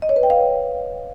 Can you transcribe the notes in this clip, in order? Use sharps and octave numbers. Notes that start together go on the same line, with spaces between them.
D#5
C#5
B4
G5
F5